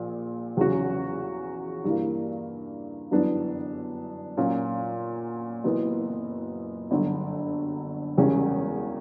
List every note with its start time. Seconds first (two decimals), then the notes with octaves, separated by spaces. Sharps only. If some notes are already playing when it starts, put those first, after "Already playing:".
Already playing: A#1 A#2
0.57 E2 C#3 F#3 C#4 F#4
1.84 G2 E3 A#3
3.11 G1 F#2 E3 B3 D4
4.37 A#2 F#3 C#4
5.64 F#1 F#2 E3 B3
6.91 G1 F#2 D3 F#3
8.17 E1 E2 C#3 G3 C#4